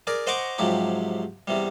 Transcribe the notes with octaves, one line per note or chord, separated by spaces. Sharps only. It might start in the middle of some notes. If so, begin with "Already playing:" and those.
G#4 A#4 D5
C5 D#5 F#5 A#5 C#6 D6
G#2 C3 F3 F#3 G4
E2 C3 G3